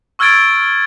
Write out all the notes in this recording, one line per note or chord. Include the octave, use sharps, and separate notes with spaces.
C#6 E6 F6 G#6 A6 D7